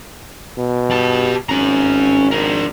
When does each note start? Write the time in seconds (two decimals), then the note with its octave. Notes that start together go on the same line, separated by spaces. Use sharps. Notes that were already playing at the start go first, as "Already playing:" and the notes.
0.58 B2
0.90 G4 A5
1.49 G#1 C#4 A#5
2.32 D4 A#4